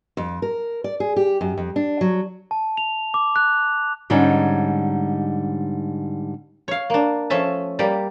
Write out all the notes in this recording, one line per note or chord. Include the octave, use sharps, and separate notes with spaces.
F2
A#4
D5
G#4
G4
F#2
F2
D4
F#3
A5
F7
D6
F#6
G#2 D3 G3 G#3 C#4 D#4
C#5 F5
A#3 D4
F3 A3 C#4 E5 A5
G3 A#3 G4 D5